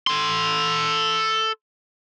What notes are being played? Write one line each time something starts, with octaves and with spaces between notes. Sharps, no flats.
A4 C6